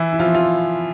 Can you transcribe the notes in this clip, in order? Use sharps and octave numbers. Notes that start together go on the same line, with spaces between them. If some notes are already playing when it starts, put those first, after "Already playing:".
Already playing: E3 E4
E4
F3 F4
F4